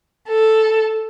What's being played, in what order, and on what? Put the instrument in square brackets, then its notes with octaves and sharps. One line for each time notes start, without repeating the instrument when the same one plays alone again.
[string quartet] A4